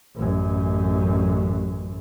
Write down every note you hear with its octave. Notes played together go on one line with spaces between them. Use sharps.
A1 F#2